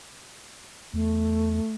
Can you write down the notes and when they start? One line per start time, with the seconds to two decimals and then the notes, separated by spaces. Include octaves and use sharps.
0.94 E2 A3